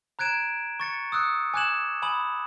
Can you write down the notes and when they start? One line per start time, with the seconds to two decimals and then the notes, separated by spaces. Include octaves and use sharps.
0.19 A#5 F#6 G#6 D7 E7
0.80 C#6 A6 C#7
1.12 D#6 E6 F#6 C#7
1.54 G#5 D6 F#6 G#6 E7 F#7
2.02 G#5 B5 D#6 F#7